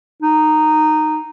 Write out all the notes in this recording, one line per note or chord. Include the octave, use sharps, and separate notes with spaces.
D#4